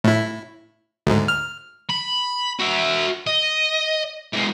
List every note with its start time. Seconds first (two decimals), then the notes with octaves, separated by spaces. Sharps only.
0.04 A2 E4
1.07 D2 G#2
1.28 F6
1.90 B5
2.59 F#4 E5
3.27 D#5
4.33 E3 G#3